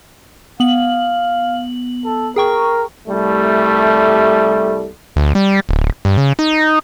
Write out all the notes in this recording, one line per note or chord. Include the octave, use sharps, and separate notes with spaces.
B3 F5 F#7
A4
G#4 A#4 G5 C#6
C2 G3 A3
D2
G3
D1
G2
C#3
D#4